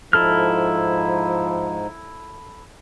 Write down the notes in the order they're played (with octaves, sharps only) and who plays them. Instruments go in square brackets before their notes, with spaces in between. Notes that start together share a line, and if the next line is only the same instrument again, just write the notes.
[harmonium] G#2 D#4 [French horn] F3 [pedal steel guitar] E4 A4 F6